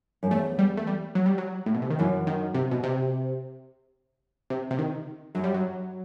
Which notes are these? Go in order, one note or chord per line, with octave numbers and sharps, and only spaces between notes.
F#2
E2 A3
G3
A3
G3
F#3
G3
F#3
A2
B2
C3
D#3
F#2 E3
D#3
C3
B2
C3
C3
C3
D#3
F#2 F#3
G3
F#3